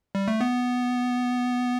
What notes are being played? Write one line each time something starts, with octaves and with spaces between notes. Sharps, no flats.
G3
A3
B3